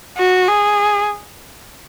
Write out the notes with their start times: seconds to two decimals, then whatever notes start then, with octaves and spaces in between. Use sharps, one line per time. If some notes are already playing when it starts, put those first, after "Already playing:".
0.17 F#4
0.48 G#4